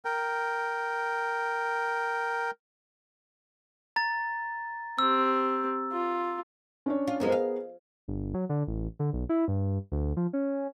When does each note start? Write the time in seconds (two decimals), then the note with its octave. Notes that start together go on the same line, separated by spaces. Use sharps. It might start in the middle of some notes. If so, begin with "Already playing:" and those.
0.05 A#4 G5
3.96 A#5 A6
4.99 C4 G4 E6
5.92 F4
6.86 C#4 D4 C#5
7.07 F4
7.20 F#2 F3 G#3 B3 G#4 A#4
7.32 F5
8.08 G1
8.34 F#3
8.49 D3
8.67 A1
8.99 D3
9.13 B1
9.29 E4
9.48 G2
9.92 D2
10.17 F3
10.33 C#4